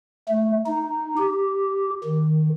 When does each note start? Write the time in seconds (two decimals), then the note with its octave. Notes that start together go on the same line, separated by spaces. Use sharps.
0.29 A3
0.66 D#4
1.18 G4
2.04 D#3